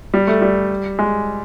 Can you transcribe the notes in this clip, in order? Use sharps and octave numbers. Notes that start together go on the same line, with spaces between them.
G3
A3
G3
G#3